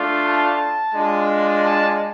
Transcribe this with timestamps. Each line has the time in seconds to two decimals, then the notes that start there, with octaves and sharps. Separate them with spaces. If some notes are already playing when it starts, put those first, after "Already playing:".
Already playing: A3 D4 F4
0.24 A5
0.94 G#3 D4 F4
1.64 A5